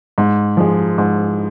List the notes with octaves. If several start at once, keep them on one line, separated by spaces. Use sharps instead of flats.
G#2
F3 G#3
G#2